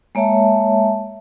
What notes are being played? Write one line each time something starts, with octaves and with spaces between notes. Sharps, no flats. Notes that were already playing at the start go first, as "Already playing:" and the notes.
G#3 A#3 C#5 E5 A5